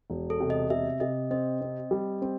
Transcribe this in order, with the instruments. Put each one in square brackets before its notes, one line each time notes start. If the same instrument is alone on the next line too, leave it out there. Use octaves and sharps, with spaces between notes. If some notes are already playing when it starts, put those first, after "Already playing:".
[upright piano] E1
[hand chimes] A4
[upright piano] C3
[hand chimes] D#5
[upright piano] C3 [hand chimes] E5
[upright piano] C3 [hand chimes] D#5
[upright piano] C4 [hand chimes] D#5
[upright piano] C4
G3
C4